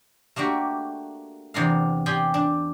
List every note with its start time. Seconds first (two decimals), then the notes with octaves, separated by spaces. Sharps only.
0.36 A3 A#3 D4 F#4 G4
1.54 E2 C3 B3 D4 A#4 F5
2.06 G4 G#4 C5 D5 G5 G#5
2.34 D4